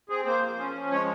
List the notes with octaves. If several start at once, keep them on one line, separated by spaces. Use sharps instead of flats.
C4 G#4
A#3 C5
F3
C#4
F3
G#3 C#5